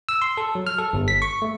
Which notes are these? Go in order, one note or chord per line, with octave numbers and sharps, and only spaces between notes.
E6
C6
A4
F#3
F6
A4
G1
B6
C#6
A3